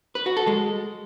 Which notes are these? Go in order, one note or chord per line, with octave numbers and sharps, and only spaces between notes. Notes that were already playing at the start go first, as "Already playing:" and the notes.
B4
F#4
A4
G#3